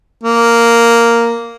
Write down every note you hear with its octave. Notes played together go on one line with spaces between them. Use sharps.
A#3